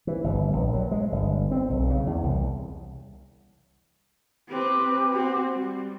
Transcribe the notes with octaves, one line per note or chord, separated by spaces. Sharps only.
E3
G1
A#1
F#3
G#3
G1
C4
B1
C#3
E2
C2
C4 G4 B4
C4 F#4
G3